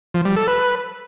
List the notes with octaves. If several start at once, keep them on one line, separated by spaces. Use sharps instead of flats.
F3
G3
A4
B4